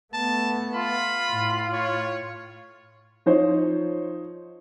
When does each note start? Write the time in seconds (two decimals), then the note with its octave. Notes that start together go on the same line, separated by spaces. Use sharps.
0.14 A3 B3 A5
0.74 F4 B5
1.31 A2
1.72 C#5
3.26 F3 D#4 C5 C#5